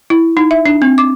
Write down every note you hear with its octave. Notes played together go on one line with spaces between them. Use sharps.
E4
D#4
E5
D4
C4
D6